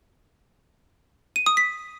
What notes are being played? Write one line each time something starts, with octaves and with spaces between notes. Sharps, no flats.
D#7
D#6
B6